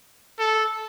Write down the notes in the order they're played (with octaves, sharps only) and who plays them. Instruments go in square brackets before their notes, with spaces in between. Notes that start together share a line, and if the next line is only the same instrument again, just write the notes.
[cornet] A4